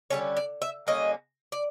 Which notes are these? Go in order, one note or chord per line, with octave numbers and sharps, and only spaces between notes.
D3 G3 A#3 C#4 C#5
D5
E5
D3 G3 A#3 C#4 D#5
D5